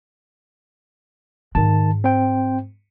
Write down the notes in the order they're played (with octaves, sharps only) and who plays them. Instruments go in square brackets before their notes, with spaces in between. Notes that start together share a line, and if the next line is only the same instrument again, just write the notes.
[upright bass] G#2 G#3 [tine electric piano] D#3 A5
[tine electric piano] C4 C5 G5